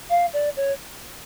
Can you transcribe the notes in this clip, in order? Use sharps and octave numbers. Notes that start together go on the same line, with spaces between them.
F5
D5
C#5